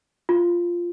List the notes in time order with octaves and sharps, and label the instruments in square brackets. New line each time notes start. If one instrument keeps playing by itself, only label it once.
[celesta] F4